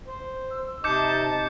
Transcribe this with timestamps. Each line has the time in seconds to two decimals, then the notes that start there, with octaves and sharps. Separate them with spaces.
0.07 C5
0.50 E6
0.84 C3 D#4 D#5 A5 D6 G6 C#7